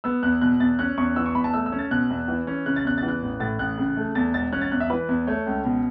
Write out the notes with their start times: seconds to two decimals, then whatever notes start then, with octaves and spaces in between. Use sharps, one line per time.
0.04 B3 E6
0.23 E2 F#6
0.41 B2 F#6
0.60 E2 A6
0.79 C#4 F#6
0.98 E2 C#6
1.16 E3 E6
1.26 C#6
1.35 E2 B5
1.44 A5
1.54 A3 E6
1.66 E6
1.72 C#4
1.79 A6
1.91 B2 F#6
2.10 E2
2.28 E3
2.47 C#4
2.66 C#3 F#6
2.76 A6
2.85 E2 F#6
2.98 A6
3.03 E3
3.08 F#6
3.22 A1
3.40 A2 A6
3.59 A1 F#6
3.78 C#3
3.97 A3
4.15 E2 A6
4.34 E1 A6
4.53 C#4 F#6
4.61 A6
4.72 E2 F#6
4.80 E5
4.90 E3 B4
5.08 E2
5.27 A3 C#5
5.46 C#2
5.65 B2